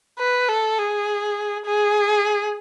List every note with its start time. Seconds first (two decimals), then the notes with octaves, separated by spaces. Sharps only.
0.19 B4
0.49 A4
0.78 G#4
1.66 G#4